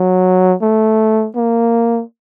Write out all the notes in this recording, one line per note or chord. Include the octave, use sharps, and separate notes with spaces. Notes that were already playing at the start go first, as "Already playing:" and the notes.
Already playing: F#3
A3
A#3